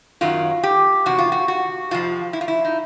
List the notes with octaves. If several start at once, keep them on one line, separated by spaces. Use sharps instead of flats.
F#2 D#3 F#3 F4
G4
E2 C3 F#4
F4
F#4
F#4
F2 C3 F3 F4
E4
F4
E4
D#4